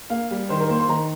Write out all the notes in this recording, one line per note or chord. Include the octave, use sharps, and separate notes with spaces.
A#3 F5
G3
D#3 C5
A#4
A#3 C5
C6
D#3 A#5